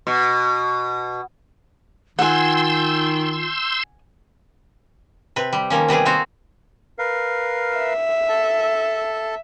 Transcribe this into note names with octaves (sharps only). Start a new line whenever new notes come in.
B2
D#3 F4 F#5 G#5 C6 E6 G6
C3 B4
G3
D#3 F3 A#3 C#4
C3 G3 B3 G#4
A#3 C4 F4 F#4
A#4 B4 F5
E5
A4 A5